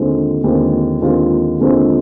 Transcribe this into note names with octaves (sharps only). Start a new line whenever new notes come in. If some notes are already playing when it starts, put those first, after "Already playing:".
Already playing: D#2 D3 G#3 C4 F4
D#2 D3 G#3 C4 F4
D#2 D3 G#3 C4 F4
D#2 D3 G#3 C4 F4